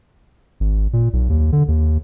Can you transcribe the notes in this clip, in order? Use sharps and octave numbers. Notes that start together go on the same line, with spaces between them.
G#1
A#2
B1
D#2
D3
D#2